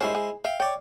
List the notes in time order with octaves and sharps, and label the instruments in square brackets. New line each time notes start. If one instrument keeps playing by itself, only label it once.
[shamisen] D#3 G3 C#4 [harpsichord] G#3 E4 C5
[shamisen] G#4
[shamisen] E5 [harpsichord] F5 G5
[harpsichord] C#5 D5 [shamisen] G5